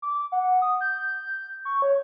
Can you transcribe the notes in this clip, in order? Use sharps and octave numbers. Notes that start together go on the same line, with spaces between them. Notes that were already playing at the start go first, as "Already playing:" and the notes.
D6
F#5
D#6
G6
C#6
C#5